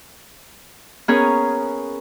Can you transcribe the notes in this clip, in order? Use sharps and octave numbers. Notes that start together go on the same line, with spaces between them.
B3 C#4 G#4 A#4 C#5